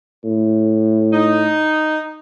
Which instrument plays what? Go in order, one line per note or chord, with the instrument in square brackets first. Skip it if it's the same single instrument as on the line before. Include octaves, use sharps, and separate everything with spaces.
[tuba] A2
[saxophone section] D#4